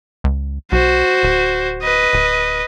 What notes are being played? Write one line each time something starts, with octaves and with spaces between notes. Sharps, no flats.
C#2
B1 F#4 C5
D1
B4 D#5
D1